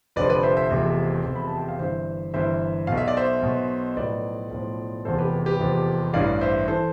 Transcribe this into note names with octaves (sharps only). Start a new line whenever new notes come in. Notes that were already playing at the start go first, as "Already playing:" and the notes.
F1 F2 D3 F3 B4 D5
B4 D5
C5 E5
C5 E5
F1 E2 C3 F3
F1 E2 C3 F3
B5
A5
G5
F5
G1 G2 E3 C5 E5
G1 G2 E3 C5 E5
B1 B2 F5
E5
D5
C5 E5
B1 B2
B1 A2 F3 B4 D5
B1 A2 F3
F1 E2 C3 F3 A4 C5
G4 B4
G4 B4
F1 E2 C3 F3
A1 G2 E3 D5 F5
C5 E5
E3 A4 C5